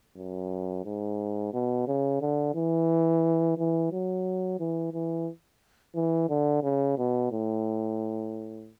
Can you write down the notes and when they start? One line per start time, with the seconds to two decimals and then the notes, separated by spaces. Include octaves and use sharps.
0.16 F#2
0.85 G#2
1.54 B2
1.87 C#3
2.21 D3
2.55 E3
3.58 E3
3.92 F#3
4.60 E3
4.93 E3
5.95 E3
6.29 D3
6.63 C#3
6.98 B2
7.32 A2